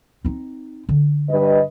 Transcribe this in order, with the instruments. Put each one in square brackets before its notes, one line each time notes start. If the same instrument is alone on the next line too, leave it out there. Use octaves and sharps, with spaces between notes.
[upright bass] C4 D#4
D3
[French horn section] G2 B4 D#5